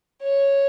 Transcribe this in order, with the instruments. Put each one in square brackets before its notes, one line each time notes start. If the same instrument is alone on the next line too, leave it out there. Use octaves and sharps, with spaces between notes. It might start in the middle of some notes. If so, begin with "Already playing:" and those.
[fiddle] C#5